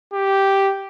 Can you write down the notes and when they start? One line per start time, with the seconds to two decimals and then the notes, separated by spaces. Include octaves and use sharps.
0.13 G4